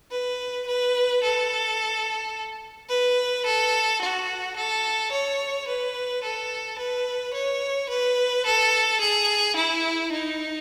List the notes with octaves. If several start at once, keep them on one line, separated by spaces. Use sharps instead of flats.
B4
B4
A4
B4
A4
F#4
A4
C#5
B4
A4
B4
C#5
B4
A4
G#4
E4
D#4